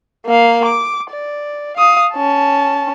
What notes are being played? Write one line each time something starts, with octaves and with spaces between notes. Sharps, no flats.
A#3 F5
D6
D5
F5 D#6
C#4 A5